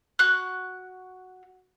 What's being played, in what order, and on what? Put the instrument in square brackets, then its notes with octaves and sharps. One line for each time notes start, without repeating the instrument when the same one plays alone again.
[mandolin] F#4 F#6